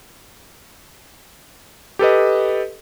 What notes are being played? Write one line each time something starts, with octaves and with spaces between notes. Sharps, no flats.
G4 A4 B4 D#5